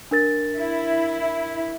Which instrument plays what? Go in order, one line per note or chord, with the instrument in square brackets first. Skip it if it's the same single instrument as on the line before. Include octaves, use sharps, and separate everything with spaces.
[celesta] D4 A#4 A6
[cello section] E4